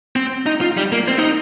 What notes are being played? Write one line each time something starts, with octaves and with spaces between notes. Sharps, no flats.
C4
D#4
F4
G3
A#3
C4
D#4